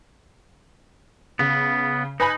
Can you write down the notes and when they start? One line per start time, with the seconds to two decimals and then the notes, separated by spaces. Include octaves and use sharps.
1.39 C#3 B3
2.20 D#4 B4 G#5 B5